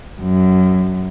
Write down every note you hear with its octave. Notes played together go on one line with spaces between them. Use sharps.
F#2